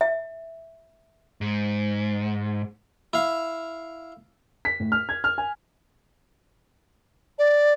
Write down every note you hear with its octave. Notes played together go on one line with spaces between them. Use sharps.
E5
G#2
E4 F5
B6
A2
F6
G#6
F6
G#5
D5